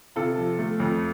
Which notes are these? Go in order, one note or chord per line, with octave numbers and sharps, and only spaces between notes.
C3 F4 A4
F3
A3
F2